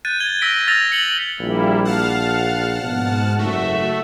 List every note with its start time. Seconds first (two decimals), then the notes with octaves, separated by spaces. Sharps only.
0.05 F#6 G6 A6 D#7
0.20 G#6 G7
0.41 E6 A#6 B6 D7
0.67 E6 F6 A6 A#6 F7
0.92 C#7 F#7 G7
1.40 A#1 G3 A#3 E4
1.85 F5 F#5 A5 F6
2.83 G#2 B2
3.39 F#1 A3 F#4 E5